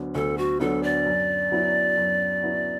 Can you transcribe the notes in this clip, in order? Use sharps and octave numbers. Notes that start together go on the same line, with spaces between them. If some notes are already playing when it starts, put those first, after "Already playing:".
Already playing: D2 D3 F#3 B3 D4
D2 A4
F#4
D3 F#3 B3 D4 A4
D5
F#2
F#3 B3 E4
F#2
F#3 B3 E4